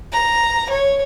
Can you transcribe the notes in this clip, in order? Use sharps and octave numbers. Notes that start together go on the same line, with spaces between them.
A#5
C#5